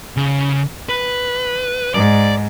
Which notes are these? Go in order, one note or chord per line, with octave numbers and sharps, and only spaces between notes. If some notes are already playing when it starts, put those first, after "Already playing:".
C#3
B4
G#2 D5